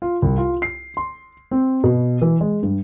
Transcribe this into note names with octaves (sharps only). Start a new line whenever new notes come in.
F4
C2
F4
C7
C6
C4
B2
E3
G#3
G2